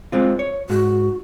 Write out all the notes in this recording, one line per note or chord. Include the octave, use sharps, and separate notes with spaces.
G#3 C4 F4
C#5
G#2 F#4